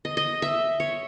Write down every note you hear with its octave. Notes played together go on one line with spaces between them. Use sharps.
D#5
D#5
E5
C#5